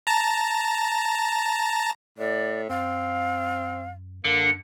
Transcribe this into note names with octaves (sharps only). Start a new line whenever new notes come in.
A5 A#5
A2 D5
F#2 C4 F5
F#2 D3 A#3